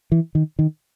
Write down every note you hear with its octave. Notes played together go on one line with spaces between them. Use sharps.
E3
D#3
D#3